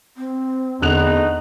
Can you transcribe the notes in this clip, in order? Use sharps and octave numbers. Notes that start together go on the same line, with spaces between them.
C4
E2 D3 A3 B3 D#4 F#6 F7